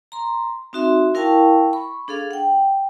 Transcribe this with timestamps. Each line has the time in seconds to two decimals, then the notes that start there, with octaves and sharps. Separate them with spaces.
0.12 A#5 C6
0.73 C4 D#4 F#4 E5 C6
1.14 E4 A#4 F5 G5 A5 C#6
1.73 B5 C#6
2.08 D4 G#4 A4 F5
2.31 F#5 G5